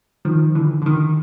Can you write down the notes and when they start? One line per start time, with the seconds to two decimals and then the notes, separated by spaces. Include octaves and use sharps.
0.25 D#3 F3
0.55 D3 E3
0.82 D3
0.86 D#3